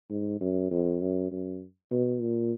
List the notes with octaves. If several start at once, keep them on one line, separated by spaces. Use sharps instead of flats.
G#2
F#2
F2
F#2
F#2
B2
A#2